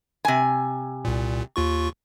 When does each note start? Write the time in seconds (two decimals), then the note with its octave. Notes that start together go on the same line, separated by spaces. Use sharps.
0.25 C3 G#5
1.05 C2 A#2
1.56 D#2 F4 C#6